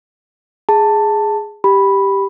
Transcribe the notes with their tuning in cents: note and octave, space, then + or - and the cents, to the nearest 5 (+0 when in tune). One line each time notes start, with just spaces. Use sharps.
G#4 +0 A5 +10
G4 +0 B5 +0